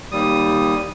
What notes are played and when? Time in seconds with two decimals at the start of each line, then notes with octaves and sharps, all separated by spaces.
0.12 D#2 G3 D#6